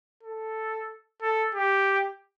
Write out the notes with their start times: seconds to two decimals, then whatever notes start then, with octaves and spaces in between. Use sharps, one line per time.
0.23 A4
1.21 A4
1.54 G4